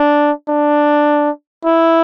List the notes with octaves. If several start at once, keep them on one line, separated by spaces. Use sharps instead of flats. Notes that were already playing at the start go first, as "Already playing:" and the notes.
Already playing: D4
D4
E4